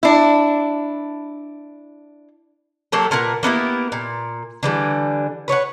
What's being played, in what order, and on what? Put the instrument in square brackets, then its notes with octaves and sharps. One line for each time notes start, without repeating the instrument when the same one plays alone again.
[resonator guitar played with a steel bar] D4 E4
[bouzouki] F#3 A#3 G4 A4
A#2 A#4 B4 F#5
A#3 B3 E4 G4
A#2
D3 E3 G3
B4 C#5 D5 F#5